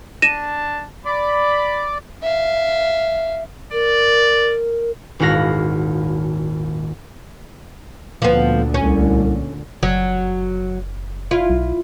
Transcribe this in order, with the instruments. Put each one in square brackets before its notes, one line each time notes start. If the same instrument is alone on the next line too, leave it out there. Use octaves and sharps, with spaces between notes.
[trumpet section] D4 A5 [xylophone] A#6 D#7 E7
[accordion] D5 [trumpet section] B5
[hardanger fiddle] E5 F5
[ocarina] A#4 [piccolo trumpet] D5
[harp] D#1 G#1 E4 F#4 F5 A#6
[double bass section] D2 A#2 D3 [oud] F3 B3
[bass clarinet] C2 [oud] C#4
[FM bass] F#1 [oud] F#3
[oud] E4 F4
[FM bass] B1